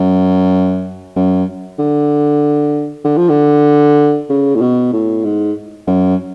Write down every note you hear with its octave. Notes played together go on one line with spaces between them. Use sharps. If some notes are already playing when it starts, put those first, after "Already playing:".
Already playing: F#2
F#2
D3
D3
F3
D3
C#3
A2
B2
A2
G#2
F#2